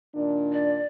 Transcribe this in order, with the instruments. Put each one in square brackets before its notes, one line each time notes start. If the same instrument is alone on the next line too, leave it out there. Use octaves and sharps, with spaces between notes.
[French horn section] A#2 D#3 D4
[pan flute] D5